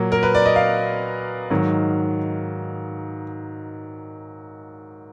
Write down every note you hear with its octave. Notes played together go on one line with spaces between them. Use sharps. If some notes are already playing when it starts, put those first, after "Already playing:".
Already playing: A#2 F#3 A#3
A#4
B4
D5
D#5
F5
G#2 D#3 F#3